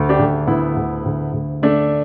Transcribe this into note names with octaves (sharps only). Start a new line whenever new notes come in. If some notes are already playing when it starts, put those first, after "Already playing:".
Already playing: D2
D4 G4
D2
D2 B3 E4
D2
D2
D2
D3 A3 D4